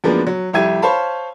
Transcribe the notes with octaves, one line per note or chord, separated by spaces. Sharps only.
F#2 F3 G#3 A#3 B3 D4
F#3
C2 F2 E4 G4 G#6 D#7
C5 C#5 F5 A5 B5